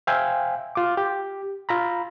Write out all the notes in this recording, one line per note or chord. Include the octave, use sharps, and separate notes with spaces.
C5 E5 F5 G5 G#5
F4 D6
G4
F4 A#5 B5